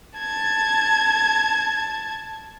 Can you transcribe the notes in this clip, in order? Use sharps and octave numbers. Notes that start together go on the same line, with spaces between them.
A5 G#6